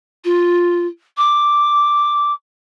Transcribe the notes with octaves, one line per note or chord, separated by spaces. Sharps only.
F4
D6